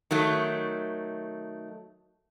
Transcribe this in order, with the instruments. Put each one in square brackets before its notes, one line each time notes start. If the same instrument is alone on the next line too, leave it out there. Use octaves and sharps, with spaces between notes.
[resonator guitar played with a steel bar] D#3 F#3 A3